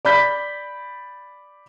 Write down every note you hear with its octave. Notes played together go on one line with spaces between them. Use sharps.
D5 B5 G6 B6